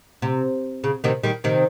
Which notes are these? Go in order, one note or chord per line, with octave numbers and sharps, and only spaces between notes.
C3
C#3
C3 D#3
D#3 G3
C3 D#3